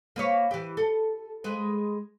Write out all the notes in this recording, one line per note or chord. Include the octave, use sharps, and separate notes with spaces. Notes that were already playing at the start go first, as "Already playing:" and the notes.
A#3 B4 C#5
E3 G4
A4
G#3 B4